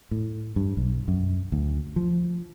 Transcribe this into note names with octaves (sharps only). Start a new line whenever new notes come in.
A2
G2
B1
F#2
D2
F3